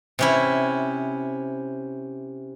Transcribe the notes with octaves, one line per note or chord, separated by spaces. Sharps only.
C3 C#4 E4